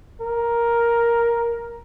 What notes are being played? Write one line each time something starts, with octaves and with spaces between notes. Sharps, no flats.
A#4